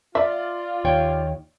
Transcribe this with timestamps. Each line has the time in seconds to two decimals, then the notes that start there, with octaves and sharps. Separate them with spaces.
0.15 F4 D5 E5
0.85 D#2 C#5 G5